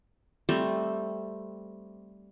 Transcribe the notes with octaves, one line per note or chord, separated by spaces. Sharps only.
G3 A3 C4